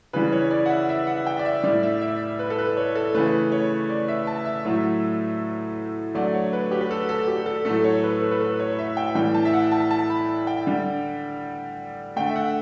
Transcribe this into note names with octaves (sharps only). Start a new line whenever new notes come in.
C#3 E3 G3 B4
C#5
D5
F#5
E5
E5
F#5
G5
D5
E5
A2 G3 D5
E5
E5
B4
A4
B4
C#5
A4
C#3 E3 A3 B4
C#5
D5
E5
A5
E5
A2 F#3 A3
D3 F#3 A3 D5
C#5
B4
G4
B4
A4
A4
G4
A4
A2 F#3 A3 A4
C#5
B4
A4
B4
A4
C#5
E5
G5
A2 E3 G3 G5
A5
E5
F#5
A5
A5
B5
G5
D3 G3
D3 A3 G5
E5
F#5